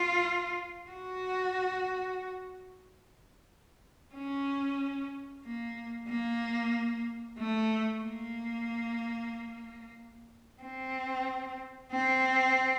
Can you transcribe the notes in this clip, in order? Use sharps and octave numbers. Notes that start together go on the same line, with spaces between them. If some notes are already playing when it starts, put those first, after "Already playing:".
Already playing: F4
F#4
C#4
A#3
A#3
A3
A#3
C4
C4